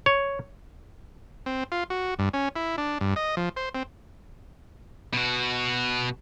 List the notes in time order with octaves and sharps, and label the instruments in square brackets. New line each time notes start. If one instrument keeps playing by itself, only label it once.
[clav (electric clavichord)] C#5
[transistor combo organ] C4
F4
F#4
G2
C#4
E4
D4
G2
D#5
F3
C5
C4
[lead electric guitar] B2 F#4